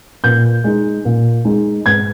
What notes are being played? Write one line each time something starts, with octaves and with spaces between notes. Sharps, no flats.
A#2 G6
G#3 D#4
A#2
G#3 D#4
G#2 G#6